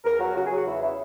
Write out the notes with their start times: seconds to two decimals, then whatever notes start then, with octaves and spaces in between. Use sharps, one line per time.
0.05 E2 A#4
0.20 F#3 F#4
0.35 C#3 F#4
0.46 F#3 G#4
0.56 F#4
0.66 E2 E4
0.81 C#3 E4